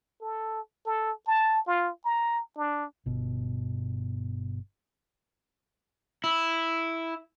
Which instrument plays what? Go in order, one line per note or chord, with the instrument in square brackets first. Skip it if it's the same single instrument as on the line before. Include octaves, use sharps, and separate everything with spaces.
[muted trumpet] A4
A4
A5
F4
A#5
D4
[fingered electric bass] G1 B2
[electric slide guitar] E4